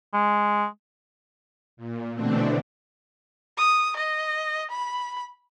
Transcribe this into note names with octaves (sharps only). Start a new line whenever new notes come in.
G#3
A#2
B2 D3 E3 A3 C4 D4
D#6
D#5
B5